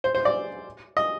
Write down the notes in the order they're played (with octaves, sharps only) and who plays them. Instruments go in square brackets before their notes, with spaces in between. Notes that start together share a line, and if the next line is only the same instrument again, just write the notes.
[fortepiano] C5
C5
D5
D#5